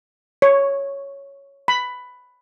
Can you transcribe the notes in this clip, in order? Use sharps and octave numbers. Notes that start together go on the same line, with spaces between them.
C#5
B5